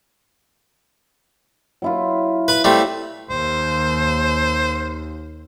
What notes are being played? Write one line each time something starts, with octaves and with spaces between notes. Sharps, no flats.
F#3 E4 F4
B4 B5
G3 A3 C4
D#2 C5